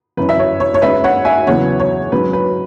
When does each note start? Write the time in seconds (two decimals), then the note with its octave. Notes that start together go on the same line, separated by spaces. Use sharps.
0.17 F#2 E3 C#4 B4
0.29 E5
0.39 C#5
0.60 C#5
0.74 C#5
0.82 G#2 G#3 C#4 B4 E5
1.04 C#5 F#5
1.25 E5 G#5
1.47 E2 C#3 F#3 B3 C#5 F#5
1.80 C#5
2.12 G#2 F#3 C#4 B4
2.33 B4